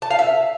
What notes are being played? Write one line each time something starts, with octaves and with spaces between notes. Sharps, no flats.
A5
F5
E5